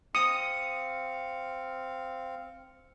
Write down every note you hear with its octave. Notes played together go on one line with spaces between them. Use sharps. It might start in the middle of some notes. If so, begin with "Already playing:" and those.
C4 F5 D#6 C#7